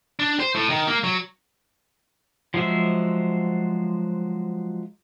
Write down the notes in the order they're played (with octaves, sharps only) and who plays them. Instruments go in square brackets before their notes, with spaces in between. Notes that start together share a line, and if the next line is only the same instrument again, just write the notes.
[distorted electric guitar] D4
C5
A2
D#3
A#3
F#3
[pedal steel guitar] F3 F#3 G#3 C5 E5